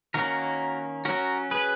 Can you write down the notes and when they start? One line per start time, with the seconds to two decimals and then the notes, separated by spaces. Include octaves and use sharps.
0.14 D#3 A#3 C#4 F#4 A#4
1.05 F#3 C#4 F#4 A#4
1.51 G#4 B4